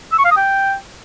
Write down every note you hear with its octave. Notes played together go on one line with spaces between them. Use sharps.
E6
C#6
F5
D#6
G5